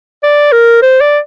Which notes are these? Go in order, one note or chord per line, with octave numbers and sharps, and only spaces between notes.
D5
A#4
C5
D5